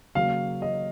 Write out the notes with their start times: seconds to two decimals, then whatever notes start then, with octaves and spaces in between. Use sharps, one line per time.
0.15 C#3 F#3 A#3 F5
0.62 D#5